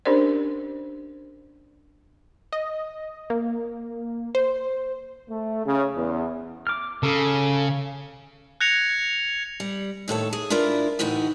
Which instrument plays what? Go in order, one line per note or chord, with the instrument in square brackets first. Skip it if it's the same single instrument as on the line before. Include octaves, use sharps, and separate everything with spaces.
[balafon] C#4 D4 G4 A#4 C5 D5
[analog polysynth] D#5
A#3
C5
[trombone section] A3
C#3
E2
[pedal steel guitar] D6 F6
[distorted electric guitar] C#3 [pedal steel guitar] A4
[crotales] F#6 G#6 A#6 C#7 F7
[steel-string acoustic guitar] G3
D#2 A2 A4 C#5
G#4
D4 E4 F4 A#4 B4
D2 A2 E3 D#4 F#4